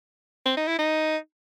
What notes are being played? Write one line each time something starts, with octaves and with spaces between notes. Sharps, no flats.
C4
D#4
E4
D#4